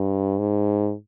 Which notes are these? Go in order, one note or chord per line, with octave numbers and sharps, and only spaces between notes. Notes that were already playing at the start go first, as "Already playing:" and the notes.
Already playing: G2
G#2